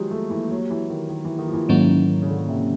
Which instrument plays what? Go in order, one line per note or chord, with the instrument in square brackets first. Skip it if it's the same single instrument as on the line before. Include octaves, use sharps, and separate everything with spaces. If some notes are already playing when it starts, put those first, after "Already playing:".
Already playing: [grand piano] D#3 F3 F#3 G#3 [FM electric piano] A#3 G4
[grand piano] A3
E3
F#3
E3
D#3
D#3
E3
D#3
F3
E3
[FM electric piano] G#2 D#3 F#3 A#3 C#4 [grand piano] E3
[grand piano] C#3
D3
C#3
C3